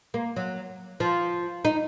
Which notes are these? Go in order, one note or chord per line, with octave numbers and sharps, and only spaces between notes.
A#3
F#3
F3
D#4